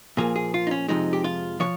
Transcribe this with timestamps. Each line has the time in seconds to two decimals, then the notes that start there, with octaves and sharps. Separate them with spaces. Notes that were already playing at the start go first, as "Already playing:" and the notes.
0.17 A#2 F3 A#3 G#4
0.36 G#4
0.54 F4
0.67 D#4
0.71 C#4
0.88 F2 C3 F3 G#3 D#4
1.13 G4
1.24 F4
1.60 C3 F3 C#5